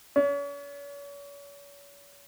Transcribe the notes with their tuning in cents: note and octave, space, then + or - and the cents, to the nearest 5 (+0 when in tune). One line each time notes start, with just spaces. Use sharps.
C#4 +40